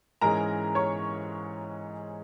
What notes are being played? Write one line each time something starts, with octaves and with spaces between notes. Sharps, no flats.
G#2 E3 G#3 C#4 A#4 A#5
C#5 C#6